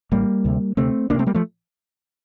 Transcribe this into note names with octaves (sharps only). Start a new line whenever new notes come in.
A1 A2 G3 A#3
D2 C3
D2 C3 A3 C4
D2 A#3 D4
C3
A3 C4
G3 A#3
F3 A3